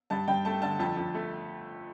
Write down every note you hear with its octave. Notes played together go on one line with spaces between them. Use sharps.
G2 A5
G2 G5
A3 A5
D3 A5
F2 A5
F2
A3